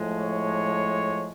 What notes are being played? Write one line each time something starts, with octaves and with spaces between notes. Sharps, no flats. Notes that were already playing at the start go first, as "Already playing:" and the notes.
Already playing: A2 F3 G#3
C#5